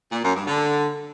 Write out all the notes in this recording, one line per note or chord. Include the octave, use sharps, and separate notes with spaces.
A#2
F#2
G2
D3